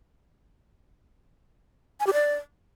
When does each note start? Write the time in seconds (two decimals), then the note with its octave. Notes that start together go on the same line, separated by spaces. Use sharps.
2.00 G#5
2.07 G4
2.13 D5